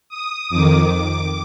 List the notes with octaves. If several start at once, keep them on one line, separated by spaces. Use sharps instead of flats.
D#6
F2 D#3 D6